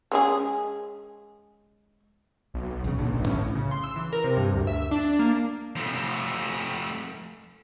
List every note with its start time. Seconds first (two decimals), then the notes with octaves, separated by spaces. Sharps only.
0.12 G#3 C#4 G#4
2.54 B1
2.84 B1 E2 C#3
2.98 B1 A#2 D3 E3
3.14 G1 A2
3.26 E2 A2 D3 C#4
3.55 C#3
3.71 C6
3.84 E6
3.96 E3
4.13 A#4
4.24 C3
4.37 G2
4.53 D2
4.67 E5
4.91 D4
5.05 D4
5.19 A#3
5.76 F3 A3